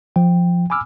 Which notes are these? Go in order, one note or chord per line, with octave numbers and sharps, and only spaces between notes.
F3 G5
G#5 B5 D6 E6 F6